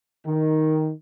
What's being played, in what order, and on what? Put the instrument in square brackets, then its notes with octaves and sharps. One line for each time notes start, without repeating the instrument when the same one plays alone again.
[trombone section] D#3